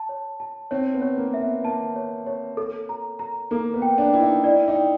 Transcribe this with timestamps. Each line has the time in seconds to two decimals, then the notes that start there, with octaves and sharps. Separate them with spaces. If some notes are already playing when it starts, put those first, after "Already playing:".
Already playing: A5
0.09 C#5
0.40 A5
0.71 C4 C#5
0.94 B3
1.02 C#5
1.17 A#3
1.34 E5
1.41 B3
1.64 A#3 A5
1.96 C#5
2.27 C#5
2.57 A4
2.89 A#5
3.19 A#5
3.51 A#3 A4
3.74 B3
3.82 G5
3.98 D4
4.13 E4 G5
4.21 D#4
4.44 E4 D5
4.68 D#4
4.76 G5